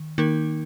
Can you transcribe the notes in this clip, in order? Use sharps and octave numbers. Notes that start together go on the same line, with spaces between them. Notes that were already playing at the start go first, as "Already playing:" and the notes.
Already playing: D#3
D#3 A#3 D#4 A#4